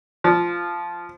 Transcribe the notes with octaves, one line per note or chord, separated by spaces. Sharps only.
F3